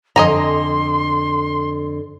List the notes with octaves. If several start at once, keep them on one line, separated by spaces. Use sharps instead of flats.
F2 D3 D#5 G#5 A#5 C6